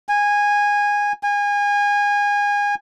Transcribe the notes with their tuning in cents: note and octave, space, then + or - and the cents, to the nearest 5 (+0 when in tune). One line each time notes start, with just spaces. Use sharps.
G#5 -15
G#5 -25